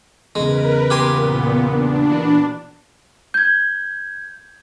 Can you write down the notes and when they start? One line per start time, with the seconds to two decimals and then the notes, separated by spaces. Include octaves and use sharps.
0.35 E2 C#3 G#3 A#4 B4
0.90 A#2 B3 G4 G#5 C6
1.68 D4
2.10 E3 F#4 B4
3.34 G6 G#6